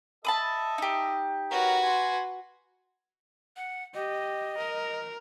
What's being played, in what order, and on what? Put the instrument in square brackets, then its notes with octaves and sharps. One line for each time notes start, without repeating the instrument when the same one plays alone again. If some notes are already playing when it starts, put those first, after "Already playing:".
[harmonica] A4 D#5 E5 [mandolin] A5 B5 D#6
[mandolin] D#4 G4
[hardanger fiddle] F#4 B4 [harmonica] A#4 C#5 F#5
[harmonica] G#5 C6
[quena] F#5
[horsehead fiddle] G4 [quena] D#5
[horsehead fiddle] A#4